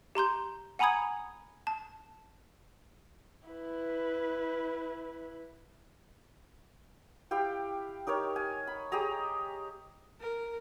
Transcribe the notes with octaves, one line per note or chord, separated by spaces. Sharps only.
G4 A#5 C6 G6
F#5 G#5 A#5 B5 D#6 G#6
A5
E4 B4
E4 G4 F5 G5
D#4 G4 A#4 C#5
G#5
B5
G4 G#4 D#5 A#5
A#4